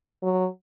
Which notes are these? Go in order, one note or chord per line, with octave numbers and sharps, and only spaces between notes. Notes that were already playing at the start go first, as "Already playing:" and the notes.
F#3